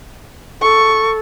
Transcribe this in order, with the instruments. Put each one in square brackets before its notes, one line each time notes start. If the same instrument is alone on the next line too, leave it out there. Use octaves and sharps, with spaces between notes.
[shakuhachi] A4 [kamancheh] C#6